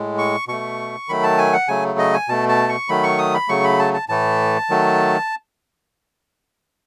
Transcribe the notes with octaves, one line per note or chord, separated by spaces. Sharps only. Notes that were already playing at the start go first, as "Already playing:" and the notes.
Already playing: A2 G#3
C#6
B2 A3 C#6
D#3 F#3 A3 B5
A5
G#5
F#5
C#3 F#3 A3 G#5
D#5
G#5
B2 A3 A5
A5
C#6
D#3 F#3 A3 B5
C#6
D#6
B5
C#3 F#3 A3 C#6
B5
A5
A5
A2 E3 A3 A5
D#3 F#3 A3